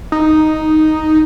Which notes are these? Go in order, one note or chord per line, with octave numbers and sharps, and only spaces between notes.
D#4